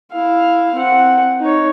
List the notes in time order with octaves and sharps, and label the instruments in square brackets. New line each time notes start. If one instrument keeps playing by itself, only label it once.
[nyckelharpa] E4 F5
C4 F#5
D#4 C#5